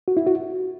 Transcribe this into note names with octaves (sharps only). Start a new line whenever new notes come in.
F#4
E4
F#4